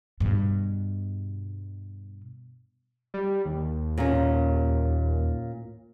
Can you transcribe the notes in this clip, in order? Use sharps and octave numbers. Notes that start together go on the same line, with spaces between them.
G2 B2
G3
D#2
A#2 C#4